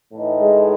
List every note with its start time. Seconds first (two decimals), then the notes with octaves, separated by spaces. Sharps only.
0.12 A2 E3 A3 D#4
0.41 G#3